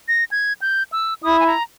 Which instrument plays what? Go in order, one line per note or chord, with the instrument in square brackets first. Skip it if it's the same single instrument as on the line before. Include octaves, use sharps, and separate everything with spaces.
[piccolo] A#6
G#6
G6
E6
[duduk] E4 [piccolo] D#6
[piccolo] G#5
A#5